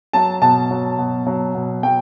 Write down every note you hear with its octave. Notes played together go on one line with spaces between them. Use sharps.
F#3 A5
B2 A5
F#3
B2
F#3
B2
F#3 G5